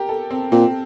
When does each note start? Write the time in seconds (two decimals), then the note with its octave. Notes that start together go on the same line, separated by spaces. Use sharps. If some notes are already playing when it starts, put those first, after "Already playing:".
Already playing: G4 A#4
0.09 A4
0.31 C4
0.52 A#2 C4